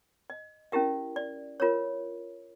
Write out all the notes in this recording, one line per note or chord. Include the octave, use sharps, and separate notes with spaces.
D#5
C#4 E4 G4 A#4 E5
D5
F4 A#4 C#5